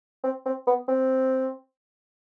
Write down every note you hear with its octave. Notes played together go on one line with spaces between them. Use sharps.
C4
C4
B3
C4